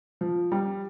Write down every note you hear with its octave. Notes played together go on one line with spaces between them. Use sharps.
F3
G3